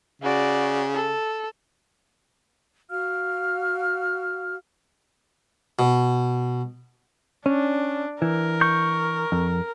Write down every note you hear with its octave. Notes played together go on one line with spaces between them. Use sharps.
C#3 F#4 D5
A4
F#4 F5 F6
B2
C#4 D4
E3 A#4
C#6 G6
F2